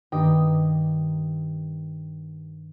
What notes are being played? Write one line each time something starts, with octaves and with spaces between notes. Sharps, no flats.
G2 D#3 A#3 G4 G5 D#6